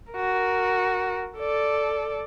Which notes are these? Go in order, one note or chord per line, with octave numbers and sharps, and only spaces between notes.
F#4 A#4
A4 D5